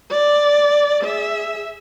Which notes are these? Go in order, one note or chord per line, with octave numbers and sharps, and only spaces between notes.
D5
G#4 E5